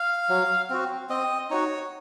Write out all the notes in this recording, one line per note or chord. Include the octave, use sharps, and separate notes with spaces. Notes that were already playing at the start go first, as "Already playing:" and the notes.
Already playing: F5
F#3
C4 F#4
C4 D#5
D#4 F#4 C#5